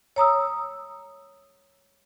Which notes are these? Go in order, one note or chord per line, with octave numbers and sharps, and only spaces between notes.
C#5 A#5 D#6 E6